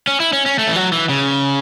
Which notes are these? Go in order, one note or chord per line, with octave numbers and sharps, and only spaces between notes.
C#4
E4
C#4
C#4
A3
E3
F#3
E3
C#3